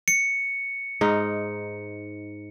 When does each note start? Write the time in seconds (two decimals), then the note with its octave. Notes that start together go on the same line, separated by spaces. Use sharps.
0.08 C#7
1.01 G#2 D#4